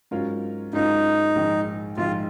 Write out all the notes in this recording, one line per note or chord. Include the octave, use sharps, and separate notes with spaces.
G#2 F#3 C#4 F4 A#4
G#2 F#3 C#4 D#4 F4 A#4
A#1 G#2 D#3
A#1 G#2 D#3 F4